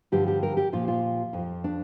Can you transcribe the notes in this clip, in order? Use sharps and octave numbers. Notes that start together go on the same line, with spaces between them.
G2 D3 F3 G4
G4
A#4
G4
A#2 F3 F4
F4
F2 F3
D4